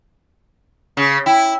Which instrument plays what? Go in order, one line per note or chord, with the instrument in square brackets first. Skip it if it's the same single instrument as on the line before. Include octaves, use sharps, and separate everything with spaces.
[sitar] C#3
[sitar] E4 [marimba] G5